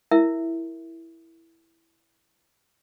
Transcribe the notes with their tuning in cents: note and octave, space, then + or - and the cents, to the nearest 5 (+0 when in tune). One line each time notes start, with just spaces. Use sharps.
E4 +0 A#4 +0 E5 +0